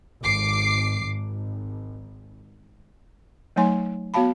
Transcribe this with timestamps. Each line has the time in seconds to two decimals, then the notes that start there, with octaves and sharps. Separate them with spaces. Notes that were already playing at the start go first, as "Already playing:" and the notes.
0.22 G#1 D6 C7
1.04 G#1
3.56 F#3 A3 D#4 C#5 G#5 C6
4.14 B3 F#4 C#5 F5 A5 B5